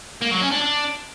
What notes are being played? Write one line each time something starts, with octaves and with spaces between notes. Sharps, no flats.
A#3
F#3
C#4
D4
D4